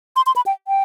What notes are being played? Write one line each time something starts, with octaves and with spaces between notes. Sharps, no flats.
C6
C6
B5
G5
G5